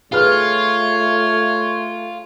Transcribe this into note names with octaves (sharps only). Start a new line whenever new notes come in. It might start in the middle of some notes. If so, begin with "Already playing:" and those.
A3 F4 G#4 B4 C#5 F6